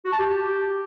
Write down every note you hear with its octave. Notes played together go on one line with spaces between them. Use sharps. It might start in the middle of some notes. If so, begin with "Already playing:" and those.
F#4
A5
G4